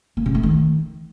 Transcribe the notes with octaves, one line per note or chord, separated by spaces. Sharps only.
A#3
C#3
A3
D#3